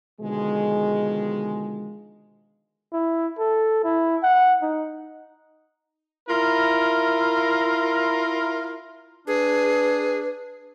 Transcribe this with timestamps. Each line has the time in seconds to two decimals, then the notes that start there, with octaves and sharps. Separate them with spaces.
0.20 B2 D3 D#3 F3 G#3
2.93 E4
3.38 A4
3.84 E4
4.23 F#5
4.62 D#4
6.29 E4 F4 A#4
9.27 D4 G#4 B4